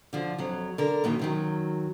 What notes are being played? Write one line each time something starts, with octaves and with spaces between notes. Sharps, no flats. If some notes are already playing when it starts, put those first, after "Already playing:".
D3 F3
F2 F#3
D3 A#4
F#2 A#2 D#3 E3
F#2 D#3 F#3